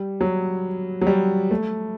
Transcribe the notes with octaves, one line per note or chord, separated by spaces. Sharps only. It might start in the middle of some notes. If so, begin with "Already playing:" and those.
Already playing: G3
F#3
F#3
G3
A3